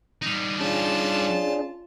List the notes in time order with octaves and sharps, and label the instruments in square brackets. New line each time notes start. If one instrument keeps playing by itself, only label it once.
[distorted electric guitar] G3 D#4
[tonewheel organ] C#4 D4 G#4 [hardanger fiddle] F4 A5